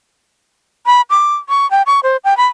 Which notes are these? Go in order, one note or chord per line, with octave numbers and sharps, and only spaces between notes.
B5
D6
C#6
G5
C#6
C5
G5
B5